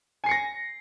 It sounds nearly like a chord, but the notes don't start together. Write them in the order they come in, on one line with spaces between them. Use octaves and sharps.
G#5 C7 C#7 A#6